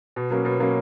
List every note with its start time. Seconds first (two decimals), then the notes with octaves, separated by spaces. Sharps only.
0.16 B2
0.30 F#3 A#3 C#4
0.45 B2
0.59 F#3 A#3 C#4